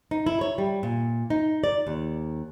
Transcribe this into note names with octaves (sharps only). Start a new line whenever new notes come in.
D#4
E4
C#5
G3
A#2
D#4
D5
D#2